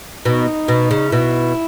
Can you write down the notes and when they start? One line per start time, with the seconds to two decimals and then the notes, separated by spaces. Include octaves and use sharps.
0.25 B2 D#4
0.68 B2
0.91 C#3
1.11 B2 E4